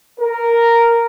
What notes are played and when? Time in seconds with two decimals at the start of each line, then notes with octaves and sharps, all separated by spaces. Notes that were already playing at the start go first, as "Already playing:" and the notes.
0.20 A#4